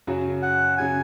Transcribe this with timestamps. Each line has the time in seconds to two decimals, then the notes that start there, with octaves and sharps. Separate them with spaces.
0.07 F#2 C#3 F#3
0.42 F#5
0.78 C#3 F#3 G#5